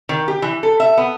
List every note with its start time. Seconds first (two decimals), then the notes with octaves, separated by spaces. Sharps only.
0.09 D#3
0.28 G4
0.42 E3
0.63 A4
0.80 E5
0.97 B3